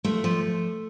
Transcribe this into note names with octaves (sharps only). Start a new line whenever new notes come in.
F3 A3
F3